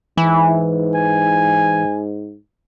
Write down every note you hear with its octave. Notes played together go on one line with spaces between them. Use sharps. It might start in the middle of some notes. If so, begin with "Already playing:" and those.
G#2 E3
G#5